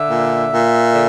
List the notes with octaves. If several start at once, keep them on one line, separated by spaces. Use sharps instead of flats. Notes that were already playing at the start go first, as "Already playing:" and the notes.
Already playing: D3 E5
A#2
A#2
D3